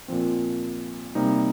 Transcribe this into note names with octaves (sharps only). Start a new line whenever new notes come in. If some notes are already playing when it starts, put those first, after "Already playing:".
A#2 F3 C4
C3 G3 A#3 D#4